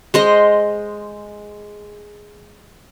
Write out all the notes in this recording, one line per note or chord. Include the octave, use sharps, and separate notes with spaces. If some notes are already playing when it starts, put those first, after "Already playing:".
G#3 C5 D#5